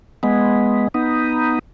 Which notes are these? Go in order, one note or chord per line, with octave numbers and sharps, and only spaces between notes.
G#3 B3
B3 D#4